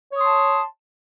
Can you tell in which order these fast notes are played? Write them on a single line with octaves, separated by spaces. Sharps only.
C#5 D#6 C6 A5